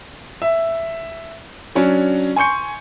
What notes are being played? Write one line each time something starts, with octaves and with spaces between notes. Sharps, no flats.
E5
F#3 C#4 D4
G#5 C6 C#6 G6 C#7